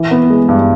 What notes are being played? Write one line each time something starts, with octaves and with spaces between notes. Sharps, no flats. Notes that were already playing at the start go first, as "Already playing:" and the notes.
Already playing: E3
B3
G#3
G2